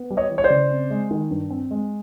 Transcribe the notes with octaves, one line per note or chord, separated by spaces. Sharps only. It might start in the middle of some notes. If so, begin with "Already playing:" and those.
Already playing: B3
G3
C#5 D#5
E3
C#5
C5 D5
C#3
C4
G#3
D#3
G2
C4
G#3